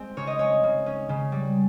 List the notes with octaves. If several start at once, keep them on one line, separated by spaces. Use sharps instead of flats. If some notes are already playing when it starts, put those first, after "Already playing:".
Already playing: G#3 C4
C#3 C#5
D#5
G#3 C#5
C#3
C#4
C#3
G3